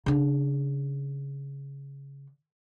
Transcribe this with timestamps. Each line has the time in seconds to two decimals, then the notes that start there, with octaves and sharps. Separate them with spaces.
0.06 C#3 D4